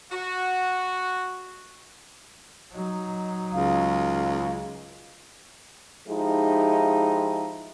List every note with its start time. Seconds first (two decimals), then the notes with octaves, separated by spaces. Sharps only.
0.11 F#4
2.72 F#3 D#4
3.53 C#2 F5
6.07 F3 G#3 D#4 E4 G4